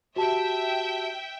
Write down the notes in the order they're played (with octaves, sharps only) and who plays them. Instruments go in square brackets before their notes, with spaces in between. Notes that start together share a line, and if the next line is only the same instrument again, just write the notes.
[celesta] F#4 G4 A5 [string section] E5 G5